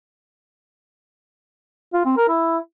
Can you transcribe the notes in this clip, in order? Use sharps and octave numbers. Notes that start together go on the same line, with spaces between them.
F4
C4
A#4
E4